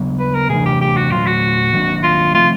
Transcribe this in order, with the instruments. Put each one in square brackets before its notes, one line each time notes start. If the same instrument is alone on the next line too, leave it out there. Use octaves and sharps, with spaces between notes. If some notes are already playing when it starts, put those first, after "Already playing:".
Already playing: [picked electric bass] C#3 F#3 B3
[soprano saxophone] B4
A#4
[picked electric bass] C3 E3 A3 D4 [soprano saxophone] G#4
[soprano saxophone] G4
G4
F#4
[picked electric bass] A#2 F#3 A3 [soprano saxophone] F4
[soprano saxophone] F#4
[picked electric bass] D#3 F#3 A#3 D4
[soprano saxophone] F4
[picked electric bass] F3 A3 C4 [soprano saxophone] F4